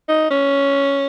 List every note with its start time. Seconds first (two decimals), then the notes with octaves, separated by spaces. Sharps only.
0.09 D#4
0.31 C#4